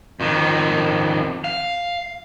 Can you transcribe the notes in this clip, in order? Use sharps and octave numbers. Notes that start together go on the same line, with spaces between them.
F2 D#3
F5